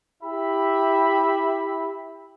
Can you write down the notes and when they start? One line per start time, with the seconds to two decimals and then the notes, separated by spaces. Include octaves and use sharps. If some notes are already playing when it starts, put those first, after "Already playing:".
0.23 E4 G4 E5 B5